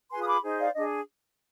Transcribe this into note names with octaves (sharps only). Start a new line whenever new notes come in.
F4 G#4 B4 G#5 C6
D#6
B5 D6
D#4 G#4 C5
D5 F5
D4 G#4 D#5